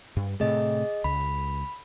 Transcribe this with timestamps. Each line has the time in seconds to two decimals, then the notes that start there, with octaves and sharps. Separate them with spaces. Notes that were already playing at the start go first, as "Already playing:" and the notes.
0.17 G2
0.40 A2 C3 A3 G#4 D#5
1.04 C#2 B5